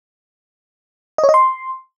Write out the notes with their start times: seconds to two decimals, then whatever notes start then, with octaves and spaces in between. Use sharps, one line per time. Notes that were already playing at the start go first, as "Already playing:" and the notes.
1.18 D#5
1.24 C#5
1.29 D#5
1.34 C6